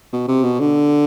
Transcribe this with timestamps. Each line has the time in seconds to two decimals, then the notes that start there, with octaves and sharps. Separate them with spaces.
0.13 B2
0.28 C3
0.44 B2
0.60 D3